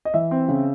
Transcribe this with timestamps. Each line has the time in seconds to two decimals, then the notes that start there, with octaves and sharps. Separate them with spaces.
0.05 D#5
0.14 E3 E5
0.31 C4
0.48 C#3